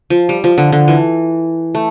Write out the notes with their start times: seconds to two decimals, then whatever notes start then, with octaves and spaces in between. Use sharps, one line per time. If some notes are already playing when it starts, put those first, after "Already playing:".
0.10 F3
0.29 G3
0.44 F3
0.58 D3
0.72 D3
0.88 E3
1.75 A3